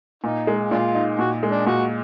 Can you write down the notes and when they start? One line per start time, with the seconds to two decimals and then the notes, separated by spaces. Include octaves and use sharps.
0.24 A#2 D#4
0.47 G#3
0.71 A#2 D4 F4
0.95 D#4
1.19 A#2 F#4
1.43 G#3
1.51 D4
1.67 A#2 F#4